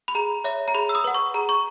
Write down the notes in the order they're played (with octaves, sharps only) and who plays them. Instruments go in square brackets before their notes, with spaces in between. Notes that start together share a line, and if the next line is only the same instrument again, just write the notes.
[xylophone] B5
G#4 A#5
C#5 E5
A#5
G#4 B5
E6
D#6
B4 F#5
C#6
G#4 A#5
C#6